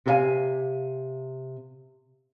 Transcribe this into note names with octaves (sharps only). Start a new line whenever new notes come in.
C3 G4 A4 B4 F5 G#5